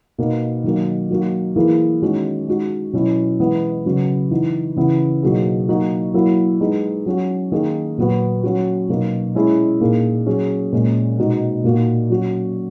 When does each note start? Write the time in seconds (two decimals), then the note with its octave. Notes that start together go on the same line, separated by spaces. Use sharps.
0.18 B2 A#3 D#4
0.64 D#3 F#3 A#3
1.10 F#3 A#3 D#4 F#4
1.56 E3 A#3 E4 G#4
2.02 D#3 G#3 C#4 F#4
2.47 G#3 D#4 F#4
2.93 B2 F#3 C#4 E4
3.40 E3 G#3 B3
3.85 C#3 F#3 B3
4.31 E3 B3 D#4
4.76 C#3 E3 B3 E4
5.23 B2 F#3 A#3 D#4 G#4
5.69 F#3 A#3 D#4 F#4
6.14 F#3 A#3 E4
6.60 G#3 B3 D#4 G#4
7.06 F#3 C#4 F#4
7.52 D#3 A#3 D#4 G#4
7.98 A#2 F#3 B3 F#4
8.43 F#3 C#4 F#4
8.89 B2 F#3 A#3 D#4 F#4
9.35 G#3 C#4 E4 G#4
9.81 A#2 A#3 D#4 G#4
10.26 F#3 C#4 G#4
10.72 A#2 G#3 C#4
11.18 B2 G#3 D#4 F#4
11.64 A#2 A#3 D#4 F#4
12.10 F#3 C#4 F#4